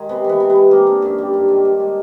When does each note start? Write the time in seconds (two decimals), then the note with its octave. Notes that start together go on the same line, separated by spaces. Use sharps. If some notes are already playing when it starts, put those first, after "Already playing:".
Already playing: D#3 G#3
0.09 C3 B3
0.24 E3 B3
0.40 C3
0.50 B3
0.56 G#3
0.71 A#3 C4
0.87 D3
1.02 F#2
1.18 G3
1.34 G2
1.48 D#3
1.65 G2
1.80 G#3